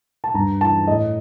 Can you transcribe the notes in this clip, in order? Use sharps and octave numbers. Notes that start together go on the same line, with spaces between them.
A5
G2 A#5
E3 A5
A2 D#5